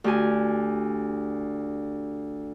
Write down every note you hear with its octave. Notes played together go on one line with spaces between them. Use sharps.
D2 G4 G#5